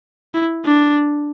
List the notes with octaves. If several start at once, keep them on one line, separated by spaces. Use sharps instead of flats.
E4
D4